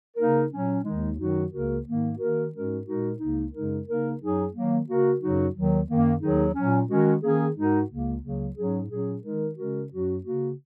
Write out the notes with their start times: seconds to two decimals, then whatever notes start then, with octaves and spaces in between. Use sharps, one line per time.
0.17 C#3 A#3 D#4 A#4
0.51 A#2 F#3 C#4
0.84 D#2 D#3 G#3 D#4
1.18 F#2 D#3 F#3 D#4 F#4
1.51 C#2 C#3 A#3 F#4 A#4
1.85 G#2 D#3 A#3
2.18 D#3 A#3 F#4 A#4
2.52 G#2 G#3 C#4 F#4 A#4
2.85 A#2 G#3 D#4 F#4 A#4
3.19 C#2 C#3 A#3 D#4
3.53 F#2 C#3 G#3 D#4 A#4
3.86 C#3 A#3 D#4 A#4
4.19 F#2 F#3 D#4 G#4
4.53 D#3 F#3 A#3
4.86 C#3 A#3 F#4 A#4
5.21 F#2 C#3 F#3 D#4 F#4
5.53 D#2 D#3 F#3
5.88 F#2 D#3 A#3
6.21 D#2 D#3 F#3 D#4 G#4
6.54 A#2 F#3 C#4
6.87 D#3 G#3 C#4 F#4 A#4
7.21 D#3 A#3 C#4 G#4
7.54 G#2 G#3 D#4 F#4 A#4
7.88 C#2 C#3 A#3
8.22 C#2 C#3 F#3 A#3
8.56 G#2 F#3 C#4 G#4
8.89 A#2 F#3 C#4 G#4
9.22 D#3 G#3 D#4 A#4
9.56 C#3 G#3 C#4 F#4 A#4
9.90 F#2 F#3 C#4 F#4
10.23 C#3 A#3 F#4